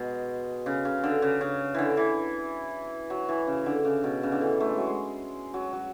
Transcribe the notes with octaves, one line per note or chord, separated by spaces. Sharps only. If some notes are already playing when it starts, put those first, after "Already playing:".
Already playing: B2 G#3
C#3
C#3
D3
C#3
C#3
D3 E3
E3
F#3
E3
C#3
D3
C#3
B2
C#3
D3
E3
A3
G#3
F#3
G#3
F#3
F#3